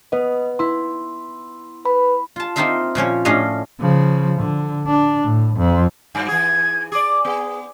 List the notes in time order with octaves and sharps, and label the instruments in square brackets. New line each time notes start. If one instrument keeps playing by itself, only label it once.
[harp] B3 [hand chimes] B4 D#5
[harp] E4 [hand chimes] C6
[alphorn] B4 [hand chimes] B5
[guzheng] F4 A5
A#3 C4 D#4 F4 E5 F5
A#2 F3 C#4 C#5
A2 C#4 D4 D#5 F5
[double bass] C#3 F3
D3
D4
A2
F2
[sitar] G2 F#3
[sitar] E3 G#4 [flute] G#6
[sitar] G#4 D5 [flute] D6
[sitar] B3 [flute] G#4